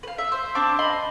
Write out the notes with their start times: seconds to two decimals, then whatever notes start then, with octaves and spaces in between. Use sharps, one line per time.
0.03 B4 F5
0.18 E5
0.32 C5
0.55 C4 D4 D6
0.79 D#5 B5 C6